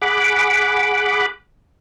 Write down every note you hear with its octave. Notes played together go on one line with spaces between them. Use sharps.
G#4 F#5 B5 D6